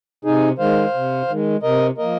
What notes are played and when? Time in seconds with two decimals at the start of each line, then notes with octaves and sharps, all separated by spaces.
0.25 C3 D#4 G#4
0.58 D#3 G#3 C5 F5
0.94 C3
1.28 D#3 G#3
1.62 C3 A#4 D#5
1.97 F3 A#3 A#4 D#5